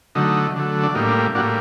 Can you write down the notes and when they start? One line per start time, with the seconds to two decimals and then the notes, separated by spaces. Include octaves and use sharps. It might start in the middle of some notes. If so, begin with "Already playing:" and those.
0.15 D3 F#3 A3 D#4
0.56 D3 F#3 A3
0.83 D4
0.95 A2 G3 A#3 D#4
1.08 D4
1.35 A2 G3 A#3 D4 F#4